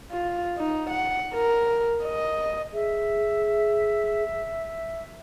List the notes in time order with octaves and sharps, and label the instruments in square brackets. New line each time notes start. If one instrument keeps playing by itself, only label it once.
[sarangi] F4
D#4
F#5
A#4
D#5
[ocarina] G#4 [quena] E5